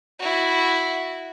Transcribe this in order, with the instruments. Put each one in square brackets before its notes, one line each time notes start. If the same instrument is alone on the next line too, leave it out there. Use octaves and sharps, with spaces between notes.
[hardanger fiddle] E4 F#4